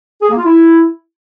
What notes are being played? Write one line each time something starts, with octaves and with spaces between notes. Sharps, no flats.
G#4
A#3
F4
E4